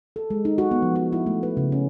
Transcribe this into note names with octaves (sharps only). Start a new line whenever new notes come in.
A4
G#3
D#4
F#4
B3
F3
F#4
E4
A3
B4
C#3
C#4